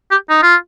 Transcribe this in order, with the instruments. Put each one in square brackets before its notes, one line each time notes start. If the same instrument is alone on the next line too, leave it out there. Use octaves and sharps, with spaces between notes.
[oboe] G4
D#4
F4